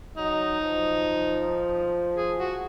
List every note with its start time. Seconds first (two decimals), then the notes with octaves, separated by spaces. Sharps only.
0.17 F#3 D#4
0.61 F3
2.16 G#4
2.39 F#4